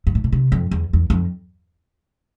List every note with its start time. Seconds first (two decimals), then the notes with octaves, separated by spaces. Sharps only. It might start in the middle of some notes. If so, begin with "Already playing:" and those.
0.07 G2
0.15 A2
0.24 B2
0.32 C3
0.52 F2
0.71 E2
0.93 E2
1.10 F2